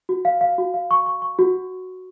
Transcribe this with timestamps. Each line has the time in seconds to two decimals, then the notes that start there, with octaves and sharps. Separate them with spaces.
0.09 F#4
0.25 F5
0.41 F5
0.58 F#4
0.74 F5
0.91 C#6
1.06 C#6
1.22 C#6
1.39 F#4